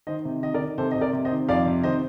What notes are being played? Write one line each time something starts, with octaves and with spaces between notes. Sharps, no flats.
D#3 C5 D#5
C3
D#3 D#5
A#4 D5
D#3
C3 A4 C5
C3 D#5
A#4 D5
C3
C5 D#5
D#3
F2 D5 F5
C3
D#3 C5 D#5